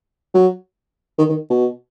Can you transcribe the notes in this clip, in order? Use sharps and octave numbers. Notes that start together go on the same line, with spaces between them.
F#3
D#3
D#3
B2